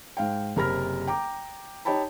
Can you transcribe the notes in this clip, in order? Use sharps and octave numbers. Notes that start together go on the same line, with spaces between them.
G#2 F5 G5
F#1 C3 A#4 B5 F6 A#6
G5 A#5 D6
D#4 G4 C#5 G5 A5 B5